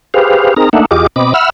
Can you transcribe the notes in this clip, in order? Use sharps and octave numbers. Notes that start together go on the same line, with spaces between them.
G4 G#4 B4 C5 F5
C4 D#4 G#4 A#4 A#5
A3 A#3 D4 D#4 E5 F#5
E2 F4 G4 G#4 D#5 D6
B2 C4 D#5 B5 D6
E5 F#5 B5 E6 F6